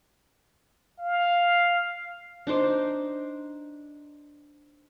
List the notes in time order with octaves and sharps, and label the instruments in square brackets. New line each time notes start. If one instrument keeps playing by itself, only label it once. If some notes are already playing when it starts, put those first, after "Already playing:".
[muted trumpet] F5
[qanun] D4 D#4 C5 D5